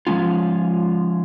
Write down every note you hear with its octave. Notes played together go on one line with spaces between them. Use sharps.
F3 G#3 C#4 F4